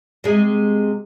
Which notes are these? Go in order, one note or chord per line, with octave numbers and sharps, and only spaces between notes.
C3 G#3